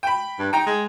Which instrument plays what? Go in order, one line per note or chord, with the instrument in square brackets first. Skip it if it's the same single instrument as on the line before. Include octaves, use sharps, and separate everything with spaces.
[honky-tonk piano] G5 B5
[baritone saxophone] G2
[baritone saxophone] D#4 [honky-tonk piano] G5 A#5
[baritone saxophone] G#3